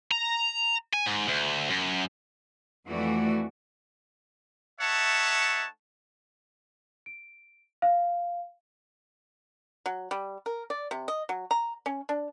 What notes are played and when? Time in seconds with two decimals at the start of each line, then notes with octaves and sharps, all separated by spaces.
0.12 A#5
0.93 G#5
1.06 G#2
1.28 D2
1.70 F#2
2.88 F2 E3 A3 F#4 D5
4.81 A3 D#4 C#5 E5 F#5 A5
7.06 D7
7.82 F5
9.86 F#3
10.11 G3
10.46 A#4
10.70 D5
10.91 C3
11.08 D#5
11.29 F#3
11.51 A#5
11.86 C#4
12.09 D4